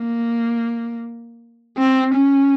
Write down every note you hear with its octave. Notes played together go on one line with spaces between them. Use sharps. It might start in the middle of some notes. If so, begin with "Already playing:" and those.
Already playing: A#3
C4
C#4